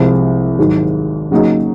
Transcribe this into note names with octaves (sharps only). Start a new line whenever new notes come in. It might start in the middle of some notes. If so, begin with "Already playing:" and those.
Already playing: C2 C3 F3 G#3
G#1 G#2 F#3
C#3 F#3 A#3 D#4 G#4